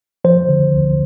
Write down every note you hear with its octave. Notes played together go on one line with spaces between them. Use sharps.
F3 C5
D3
D2